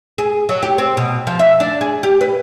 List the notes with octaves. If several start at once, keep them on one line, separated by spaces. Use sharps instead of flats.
G#4
F#3
G4
C4
B2
F3
E5
D4
G#4
G4
B4